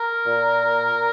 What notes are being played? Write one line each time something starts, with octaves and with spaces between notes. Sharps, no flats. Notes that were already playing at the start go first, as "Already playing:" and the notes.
Already playing: A#4
A#2